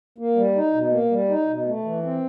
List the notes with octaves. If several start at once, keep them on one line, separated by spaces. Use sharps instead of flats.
A#3
G3
D#4
B2
A#3
G3
D#4
B2
A3
E3
C4